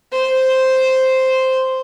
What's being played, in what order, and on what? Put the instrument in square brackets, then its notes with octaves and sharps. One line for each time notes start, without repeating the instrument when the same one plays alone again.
[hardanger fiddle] C5